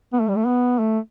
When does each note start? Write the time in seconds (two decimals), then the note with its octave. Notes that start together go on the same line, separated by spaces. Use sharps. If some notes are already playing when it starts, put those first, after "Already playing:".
0.13 B3
0.20 A3
0.29 G3
0.36 A3
0.46 B3
0.79 A3